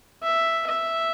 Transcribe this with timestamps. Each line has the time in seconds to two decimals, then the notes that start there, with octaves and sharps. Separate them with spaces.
0.23 E5
0.66 E5